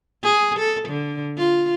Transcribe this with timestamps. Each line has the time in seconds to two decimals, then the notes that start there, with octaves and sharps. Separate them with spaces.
0.23 G#4
0.59 A4
0.89 D3
1.37 F4